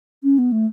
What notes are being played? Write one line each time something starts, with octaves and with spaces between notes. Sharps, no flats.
C#4
B3
A3